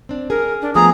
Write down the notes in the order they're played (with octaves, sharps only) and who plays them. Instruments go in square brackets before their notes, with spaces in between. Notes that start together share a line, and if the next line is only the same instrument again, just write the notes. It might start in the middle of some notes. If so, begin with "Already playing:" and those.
[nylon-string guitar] C4 D4
[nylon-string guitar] G#4 [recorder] A#4
[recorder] D4
[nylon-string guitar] F3 A3 B3 [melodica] G#4 [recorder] A#5